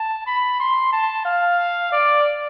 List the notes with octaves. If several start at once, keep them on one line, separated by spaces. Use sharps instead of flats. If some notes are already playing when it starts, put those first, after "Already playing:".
Already playing: A5
B5
C6
A5
F5
D5